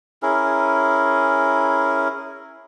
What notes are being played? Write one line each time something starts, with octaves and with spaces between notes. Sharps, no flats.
C#4 E4 G#4 A#4